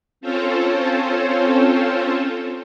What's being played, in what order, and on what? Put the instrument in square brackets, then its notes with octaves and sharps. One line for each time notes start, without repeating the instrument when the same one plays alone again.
[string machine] C4 C#4 F4 A4 C5 C#5